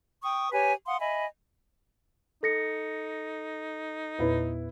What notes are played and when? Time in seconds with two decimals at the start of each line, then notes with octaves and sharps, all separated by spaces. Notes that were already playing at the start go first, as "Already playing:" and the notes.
0.23 G5 C#6 D#6
0.52 G4 B4 C#5 G#5
0.86 F5 F#5 C6 D#6
1.00 D#5 E5 G#5 B5
2.43 D#4 A4 A#6 C#7
4.19 E2 A#2 B3 E4 B4 C#5